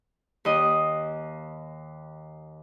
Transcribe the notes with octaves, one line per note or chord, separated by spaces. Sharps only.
D#2 D#5 D#6